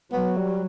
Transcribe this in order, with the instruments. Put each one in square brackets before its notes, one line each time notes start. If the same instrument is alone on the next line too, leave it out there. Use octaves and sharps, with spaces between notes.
[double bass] F#3 [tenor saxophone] B3
[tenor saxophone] G3